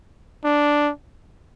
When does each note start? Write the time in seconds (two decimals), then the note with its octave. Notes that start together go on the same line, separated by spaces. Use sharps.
0.44 D4